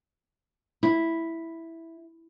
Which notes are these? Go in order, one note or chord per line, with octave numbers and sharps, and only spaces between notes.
E4